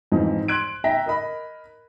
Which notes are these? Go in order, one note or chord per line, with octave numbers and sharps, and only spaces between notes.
F2 G#2 E3 D#4
C6 F#6 G#6 D7
E5 G5 A#5 A#6 B6
A#4 D#5 B5